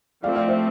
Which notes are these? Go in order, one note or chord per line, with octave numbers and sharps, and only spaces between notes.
F3 A3 C4 D5 F5
D5 F5
C5 E5